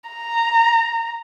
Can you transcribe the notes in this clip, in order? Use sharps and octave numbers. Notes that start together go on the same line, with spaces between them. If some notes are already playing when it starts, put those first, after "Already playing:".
A#5